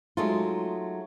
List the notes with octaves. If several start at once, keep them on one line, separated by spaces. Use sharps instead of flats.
F#3 G#3 A3 D#4 F4